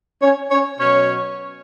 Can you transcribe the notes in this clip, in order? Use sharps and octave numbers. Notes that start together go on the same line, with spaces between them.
C#4 C#5
C#4 C#5
B2 F#3 C#4 C#5